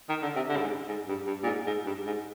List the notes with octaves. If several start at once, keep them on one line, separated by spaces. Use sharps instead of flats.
D#3
D3
C3
D3
G2
G#2
G#2
G2
G2
A#2
G#2
G#2
G2
G#2